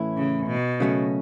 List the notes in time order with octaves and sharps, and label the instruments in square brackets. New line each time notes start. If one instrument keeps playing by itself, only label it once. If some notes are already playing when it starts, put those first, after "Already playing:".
Already playing: [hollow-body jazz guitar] A2 E3 A3 C#4 E4
[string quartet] C#3
B2
[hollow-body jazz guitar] C#3 F#3 A3 C#4